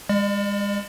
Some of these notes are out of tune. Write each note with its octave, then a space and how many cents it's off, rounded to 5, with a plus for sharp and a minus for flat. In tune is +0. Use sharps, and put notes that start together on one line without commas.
G#3 -35 D5 +30